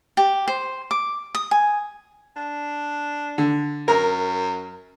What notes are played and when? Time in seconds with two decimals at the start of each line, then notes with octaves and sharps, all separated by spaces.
0.17 G4
0.48 C5
0.91 D6
1.35 D#6
1.51 G#5
2.36 D4
3.38 D3
3.88 F#2 A#4